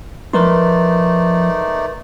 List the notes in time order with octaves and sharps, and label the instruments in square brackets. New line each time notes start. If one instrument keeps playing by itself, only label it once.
[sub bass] F3 [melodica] A3 D#4 D5 [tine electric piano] A#4 B4 C6